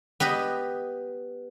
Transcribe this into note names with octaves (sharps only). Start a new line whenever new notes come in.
B3 G4 B4 D#5